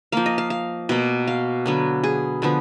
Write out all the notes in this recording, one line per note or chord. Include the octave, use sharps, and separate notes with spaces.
F3 A#3 F5
D#5
F5
F5
B2 A#3
F5
D3 F#3 B3
G#4
D3 F3 B3